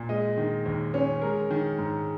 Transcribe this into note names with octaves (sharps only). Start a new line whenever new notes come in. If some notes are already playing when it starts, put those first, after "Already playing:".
Already playing: A#2
G#3 D#5
D#3
D#2
C#4
G#3 A#4
D#3
G#2